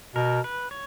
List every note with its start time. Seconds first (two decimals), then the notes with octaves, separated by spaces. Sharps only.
0.15 B2 A#4
0.44 B4
0.71 C#5